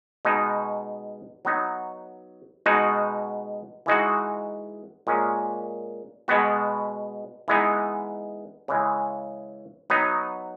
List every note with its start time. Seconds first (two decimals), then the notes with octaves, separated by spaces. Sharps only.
0.25 B2 G#3 D#4
1.45 F#3 B3 D#4 F#4
2.66 B2 G#3 D#4 F#4
3.86 E3 G#3 D#4 F#4
5.07 A#2 G#3 C#4
6.28 B2 G#3 B3 F#4
7.48 E3 G#3 B3 D#4
8.68 C#3 E3 G#3
9.90 F#3 B3 D#4